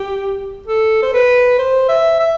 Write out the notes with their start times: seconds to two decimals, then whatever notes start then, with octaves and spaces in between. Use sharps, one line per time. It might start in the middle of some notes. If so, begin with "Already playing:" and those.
Already playing: G4
0.68 A4
1.02 C5
1.13 B4
1.58 C5
1.89 E5
2.19 E5